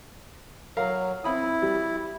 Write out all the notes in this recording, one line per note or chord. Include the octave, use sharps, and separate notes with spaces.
F#3 A#4 F5 A#5
C4 E4 B5 D#6
G3